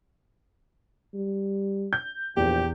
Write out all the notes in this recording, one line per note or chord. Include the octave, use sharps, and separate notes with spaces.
G3
G6
A#1 E2 G4